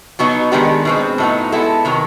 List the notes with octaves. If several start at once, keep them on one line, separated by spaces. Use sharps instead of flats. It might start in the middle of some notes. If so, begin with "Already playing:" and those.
B2 F#3 B3 D#4
D#3 G#3 B3 D4 G4
B2 G#3 C4
A2 F#3 B3 D#4
G#3 B3 E4 A4
C3 D#3 F#3